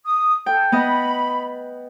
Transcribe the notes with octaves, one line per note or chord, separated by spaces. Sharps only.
D#6
A4 G5
B3 D#5 B5